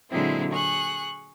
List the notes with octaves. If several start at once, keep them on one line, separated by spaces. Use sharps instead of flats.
A#2 D3 F#3 G#3 C4 E4
G#4 C#6 F#6